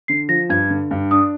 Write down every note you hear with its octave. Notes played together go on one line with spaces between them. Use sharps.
D3 C7
F3 A#6
G2 G#6
D3
G2
D4 D#6